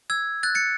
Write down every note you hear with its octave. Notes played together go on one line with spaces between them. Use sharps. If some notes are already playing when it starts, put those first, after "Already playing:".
E6 G#6
F#6 A6
A6 C#7